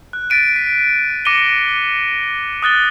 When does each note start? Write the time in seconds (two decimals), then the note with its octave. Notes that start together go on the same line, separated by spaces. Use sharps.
0.13 F#6
0.30 A6 B6 D7 D#7
0.56 B6
1.25 D6 A#6 C#7 D#7 G7
2.63 D#6 F#6 A6 G7